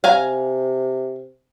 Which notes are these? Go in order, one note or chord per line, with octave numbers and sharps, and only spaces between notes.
C3 F5 G#5 A#5